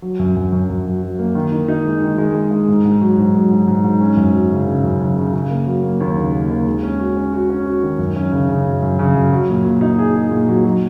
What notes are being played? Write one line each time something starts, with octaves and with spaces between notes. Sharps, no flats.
F#3
F#2
F#2
F#2
F#2
F#3
F#3
A#3
D#3
D#3
D#4
G#3
D#3
G#3
G#3
G#3
G#2
G#2
F#3
G#2
F#3
G#2
G#2
G#2
C#4
F#2
F#3
C#3
C#3
F#2
C#3
C#3
C#3
A#3
F#3
A#3
D#2
C#3
A#3
D#2
G#3
C#4
F#4
C#4
F#4
C#4
F#4
D#3
F#2
C#4
C#3
C#3
F#2
F#2
C#3
F#2
F#3
A#2
A#2
D#4
G#4
G#4
A#2
F#3
F#3